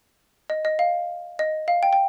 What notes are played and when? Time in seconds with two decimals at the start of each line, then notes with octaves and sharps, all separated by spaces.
0.50 D#5
0.65 D#5
0.79 F5
1.39 D#5
1.68 F5
1.83 G5
1.93 G5